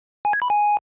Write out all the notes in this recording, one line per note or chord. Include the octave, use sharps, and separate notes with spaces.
G#5
G#6
B5
G#5